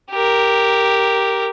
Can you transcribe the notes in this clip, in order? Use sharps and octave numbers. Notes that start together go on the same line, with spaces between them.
G4 A#4